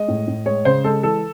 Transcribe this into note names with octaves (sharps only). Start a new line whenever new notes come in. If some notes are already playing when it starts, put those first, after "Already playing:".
Already playing: G#3 D#5
A2
A2
G#3 C#5
C#3 C5
G#3 A4
E3 A4